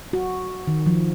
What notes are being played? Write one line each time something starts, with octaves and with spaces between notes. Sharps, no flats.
F#4
D#3
F3